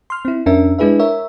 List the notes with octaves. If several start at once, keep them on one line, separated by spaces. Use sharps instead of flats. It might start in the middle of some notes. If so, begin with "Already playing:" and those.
C6 F6
C4 E4
F2 C#4 D4 A#4 E5
G#3 D4 E4 G#4 B4 E5
A#4 C#5 E5